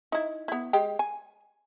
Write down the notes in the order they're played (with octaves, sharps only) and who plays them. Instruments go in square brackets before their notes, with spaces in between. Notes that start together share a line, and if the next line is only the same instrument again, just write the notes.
[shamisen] D#4 E4
B3 E4
G#3 G4 G5
G#5